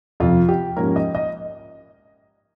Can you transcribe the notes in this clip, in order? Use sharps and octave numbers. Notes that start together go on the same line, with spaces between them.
F2 C3 F3 F4
G4
G#2 F3 A#3 C#4 A#4
D#5
D#5